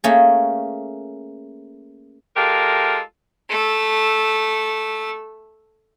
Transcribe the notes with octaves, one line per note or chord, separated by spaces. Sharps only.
A3 A#3 C#4 G#4
G#3 F4 G4 A4 A#4
A3 E6